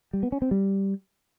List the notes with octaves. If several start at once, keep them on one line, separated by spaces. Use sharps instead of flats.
G3
B3
C#4
C4
G3